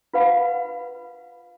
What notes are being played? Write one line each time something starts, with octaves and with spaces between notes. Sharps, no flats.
F4 B4 F5 F#5 B5